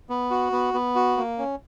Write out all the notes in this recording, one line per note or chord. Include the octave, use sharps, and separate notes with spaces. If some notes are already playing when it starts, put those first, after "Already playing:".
B3
F#4
B3
B3
F#4
A#3
C#4